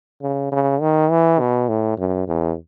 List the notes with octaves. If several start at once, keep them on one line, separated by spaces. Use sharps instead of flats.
C#3
C#3
D#3
E3
B2
A2
F#2
E2